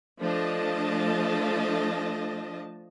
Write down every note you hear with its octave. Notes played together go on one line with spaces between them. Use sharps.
F3 A3 D4 D#5 A5